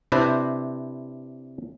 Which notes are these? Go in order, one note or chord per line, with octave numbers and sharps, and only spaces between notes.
C3 D4 E4 B4 C5 D5